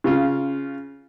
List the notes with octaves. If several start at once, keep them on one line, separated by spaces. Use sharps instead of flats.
C#3 F4